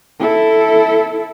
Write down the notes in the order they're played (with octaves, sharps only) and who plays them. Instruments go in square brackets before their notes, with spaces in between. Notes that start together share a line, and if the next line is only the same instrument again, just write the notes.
[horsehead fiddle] E4 A4